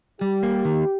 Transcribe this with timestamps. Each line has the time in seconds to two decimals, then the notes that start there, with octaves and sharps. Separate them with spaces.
0.21 G3 G4
0.43 A#3
0.65 D#3